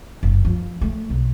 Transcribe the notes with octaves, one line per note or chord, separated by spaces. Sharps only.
F#1
F3
A3
B1